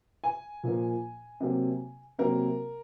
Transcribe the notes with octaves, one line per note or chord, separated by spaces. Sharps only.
G#5
A#2 F3 A#3
C3 F#3 A#3
C3 F#3 A#3 A#4